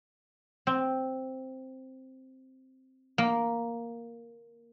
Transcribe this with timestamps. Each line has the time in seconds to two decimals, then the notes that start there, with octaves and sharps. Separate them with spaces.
0.67 C4
3.18 A#3